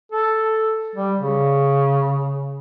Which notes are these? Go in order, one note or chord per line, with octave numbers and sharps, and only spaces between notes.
A4
G3
C#3